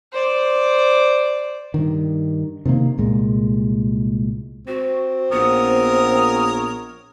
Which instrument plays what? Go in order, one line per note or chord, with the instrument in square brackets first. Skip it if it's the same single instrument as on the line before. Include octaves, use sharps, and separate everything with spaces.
[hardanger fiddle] C5 D5
[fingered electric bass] G2 D#3
C3 D#3 F3 A#3
C2 A#2 G#3
[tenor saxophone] C4 [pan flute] F#4
[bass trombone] A#1 [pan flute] B3 [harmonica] A#4 C#5 D#6